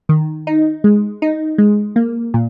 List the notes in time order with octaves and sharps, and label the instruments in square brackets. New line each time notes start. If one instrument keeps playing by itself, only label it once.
[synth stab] D#3
D#4
G#3
D#4
G#3
A#3
A#2